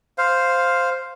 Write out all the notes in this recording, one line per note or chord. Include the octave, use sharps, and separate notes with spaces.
C5 F5